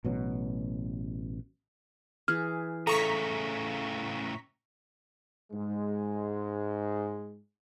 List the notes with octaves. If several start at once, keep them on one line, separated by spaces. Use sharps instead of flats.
A1 B2 F#3
E3 G#4 F6
A2 C#3 A4 A#5 C#6 B6
G#2 G#3